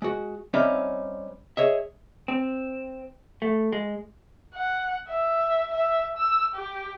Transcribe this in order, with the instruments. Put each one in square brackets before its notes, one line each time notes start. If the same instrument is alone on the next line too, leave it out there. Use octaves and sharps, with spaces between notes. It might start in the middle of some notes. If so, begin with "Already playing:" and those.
[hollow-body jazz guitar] G#3 F#4
G3 C4 C#4 D#4 E5 F5
G#4 C#5 D#5 E5
C4
A3
G#3
[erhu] F#5
E5
E5
E6
G4